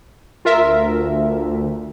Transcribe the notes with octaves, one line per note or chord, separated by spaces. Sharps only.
D2 F4 A#4 E5